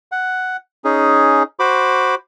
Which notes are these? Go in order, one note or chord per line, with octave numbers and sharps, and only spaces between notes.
F#5
C#4 D#4 G#4
F#4 C5 B5 D6